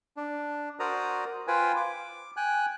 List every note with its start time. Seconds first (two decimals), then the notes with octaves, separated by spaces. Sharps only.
0.17 D4
0.80 F#4 A#4 C5 D5 A#5 D#6
1.48 F4 B4 C5 G5 G#5
1.76 D6
2.37 G5 G#5 F#6